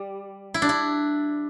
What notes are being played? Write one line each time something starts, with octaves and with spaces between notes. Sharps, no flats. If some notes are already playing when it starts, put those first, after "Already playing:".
Already playing: G3
E4
D4
E4